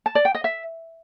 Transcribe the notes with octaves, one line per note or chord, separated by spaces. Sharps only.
A5
D5
G5
D#5
E5